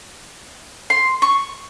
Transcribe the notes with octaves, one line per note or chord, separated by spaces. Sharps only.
C6
C#6